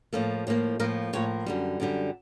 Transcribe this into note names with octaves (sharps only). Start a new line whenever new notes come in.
A2 F3 A#3 A4
A2 F3 A#3
A2 F3 A#3 A#4
A2 F3 A#3 C#5
F#2 D3 G3
F#2 D3 G3